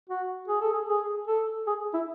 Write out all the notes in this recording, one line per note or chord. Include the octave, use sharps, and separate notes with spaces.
F#4
G#4
A4
G#4
G#4
A4
G#4
E4